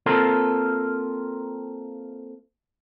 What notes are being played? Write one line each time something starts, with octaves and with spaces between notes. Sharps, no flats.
A#3 C4 F4 A4 A#4